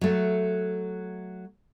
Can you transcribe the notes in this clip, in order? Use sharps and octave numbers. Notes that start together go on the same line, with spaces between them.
F#3 A3